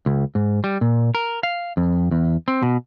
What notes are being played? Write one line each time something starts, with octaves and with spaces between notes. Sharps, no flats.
C#2
G#2
G3
A#2
A#4
F5
F2
E2
C4
B2